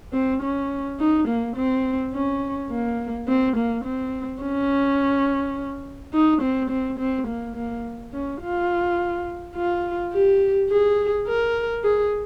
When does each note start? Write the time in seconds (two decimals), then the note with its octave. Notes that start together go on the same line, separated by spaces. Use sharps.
0.13 C4
0.42 C#4
1.00 D#4
1.28 A#3
1.56 C4
2.14 C#4
2.71 A#3
3.28 C4
3.56 A#3
3.84 C4
4.42 C#4
6.13 D#4
6.42 C4
6.70 C4
6.99 C4
7.27 A#3
7.56 A#3
8.13 C#4
8.41 F4
9.55 F4
10.12 G4
10.70 G#4
11.28 A#4
11.84 G#4